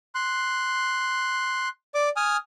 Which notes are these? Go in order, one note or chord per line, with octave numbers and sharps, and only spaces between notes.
C6 F#6
D5 D6
G#5 D#6 F6